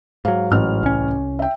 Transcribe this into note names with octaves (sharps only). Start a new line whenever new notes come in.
G#2 F#3 F5
A1 F6
C2 C#4
E5 G5